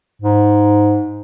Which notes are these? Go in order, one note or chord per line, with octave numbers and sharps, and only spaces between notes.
G#2